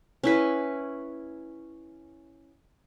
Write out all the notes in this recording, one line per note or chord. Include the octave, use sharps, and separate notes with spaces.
C#4 E4 B4